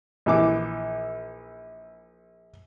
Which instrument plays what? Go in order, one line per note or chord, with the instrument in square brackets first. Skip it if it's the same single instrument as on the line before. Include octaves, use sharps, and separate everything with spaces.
[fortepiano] A#1 E3 D6